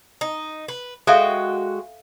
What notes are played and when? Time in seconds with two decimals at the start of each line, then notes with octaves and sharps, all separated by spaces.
0.21 D#4
0.68 B4
1.07 G#3 F#4 A4 E5 F5 G5